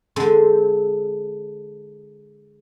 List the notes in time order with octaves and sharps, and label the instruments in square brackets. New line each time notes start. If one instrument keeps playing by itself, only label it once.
[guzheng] D3 G#3 C4